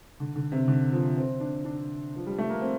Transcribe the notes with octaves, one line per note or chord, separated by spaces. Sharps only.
D3
D3
C3
D3
F3
C4
D4
D4
F3
G3
A3
A#3
C4